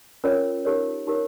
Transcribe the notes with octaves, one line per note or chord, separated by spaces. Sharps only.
C#4 F4 A#4 C#5
D#4 G4 A#4 C#5
D#4 G4 A#4 C#5